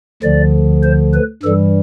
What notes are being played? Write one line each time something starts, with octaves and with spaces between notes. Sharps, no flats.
D2 D3 F3 D5
C5
B4
G2 E3 G3 A4